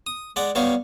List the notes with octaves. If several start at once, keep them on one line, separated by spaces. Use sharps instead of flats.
D#6
G#3 D5 F#5
G3 B3 C#5 F5